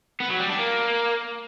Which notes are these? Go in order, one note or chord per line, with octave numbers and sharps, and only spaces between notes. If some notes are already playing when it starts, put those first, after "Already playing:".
B3
F#3
G3
D4
A#3